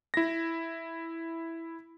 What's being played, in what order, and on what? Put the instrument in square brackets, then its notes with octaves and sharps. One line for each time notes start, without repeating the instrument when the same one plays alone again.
[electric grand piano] E4 A#6